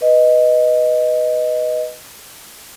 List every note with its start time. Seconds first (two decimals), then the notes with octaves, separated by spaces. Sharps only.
0.01 B4 D#5